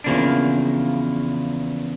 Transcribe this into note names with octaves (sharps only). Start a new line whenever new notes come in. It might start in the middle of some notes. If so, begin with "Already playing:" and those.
E2 C#3 F3 A#3 D4